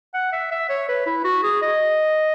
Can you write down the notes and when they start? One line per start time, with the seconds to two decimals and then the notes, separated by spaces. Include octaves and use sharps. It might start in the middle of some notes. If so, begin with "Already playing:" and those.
0.14 F#5
0.32 E5
0.52 E5
0.70 C#5
0.89 B4
1.06 E4
1.25 F#4
1.43 G#4
1.62 D#5